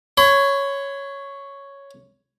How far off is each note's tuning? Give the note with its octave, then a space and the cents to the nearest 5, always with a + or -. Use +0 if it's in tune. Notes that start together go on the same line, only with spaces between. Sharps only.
C#5 +0 B5 +45